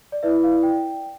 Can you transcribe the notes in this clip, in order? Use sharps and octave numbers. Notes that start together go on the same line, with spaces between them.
D5
E4 B4 D5 E5
F5
G5